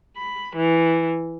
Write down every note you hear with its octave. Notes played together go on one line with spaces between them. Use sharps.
B5
E3